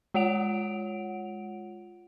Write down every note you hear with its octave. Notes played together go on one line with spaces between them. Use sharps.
G#3 F4 C#5 F#5 D7 F7